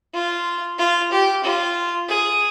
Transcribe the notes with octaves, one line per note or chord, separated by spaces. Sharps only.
F4
F4
G4
F4
G#4